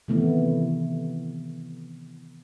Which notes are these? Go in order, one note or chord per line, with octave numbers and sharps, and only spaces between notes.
C3 D#3 E3 A3 B3 E4